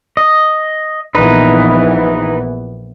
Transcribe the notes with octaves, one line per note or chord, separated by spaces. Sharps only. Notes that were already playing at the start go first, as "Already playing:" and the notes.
D#5
A#1 E3 B3 D#4 B4